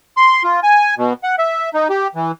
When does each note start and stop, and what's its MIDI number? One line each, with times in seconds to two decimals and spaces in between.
0.17 0.43 84
0.44 0.60 65
0.63 0.95 80
0.98 1.13 47
1.23 1.36 78
1.39 1.69 76
1.74 1.88 63
1.90 2.08 67
2.15 2.32 52